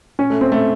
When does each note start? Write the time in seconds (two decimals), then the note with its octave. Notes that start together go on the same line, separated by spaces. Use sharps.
0.19 C#4
0.30 A3
0.41 C4
0.52 A3